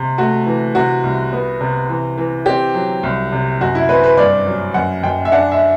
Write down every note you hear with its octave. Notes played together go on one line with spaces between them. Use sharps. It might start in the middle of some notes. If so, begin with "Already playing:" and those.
Already playing: C3
A3 F#4
E3
C3 F#4
C2
B3
C3
E3
E3
C4 G4
F#3
C2
C3
F#2 F#4
E4
C4 B4
B4
G2 D5
F#3
F#2 F#5
F#2 G5
E5
D4 F#5
E5